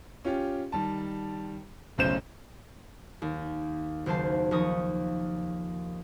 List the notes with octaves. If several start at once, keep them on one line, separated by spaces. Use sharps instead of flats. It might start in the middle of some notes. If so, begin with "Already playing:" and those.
C#4 F4 G4
D#3 G3 A5
D1 B1 C#3 C5 G6 E7
D#2
F#1 D#2 C5 A5 C7
D#2 F3 D#4 C#6 D#6